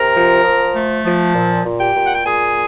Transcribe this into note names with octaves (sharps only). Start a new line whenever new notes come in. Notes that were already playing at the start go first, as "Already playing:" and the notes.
Already playing: C3 A#4 A#5
F3
F3
A3
F3
A#2
A#2
G4 G5
A#2
F#5
G5
A#2 G#4 G#5